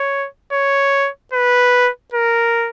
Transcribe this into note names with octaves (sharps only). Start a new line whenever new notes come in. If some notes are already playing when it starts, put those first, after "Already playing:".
Already playing: C#5
C#5
B4
A#4